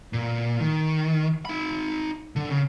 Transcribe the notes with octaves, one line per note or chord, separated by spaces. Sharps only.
A#2
D#3
D#4 B5
D3
C#3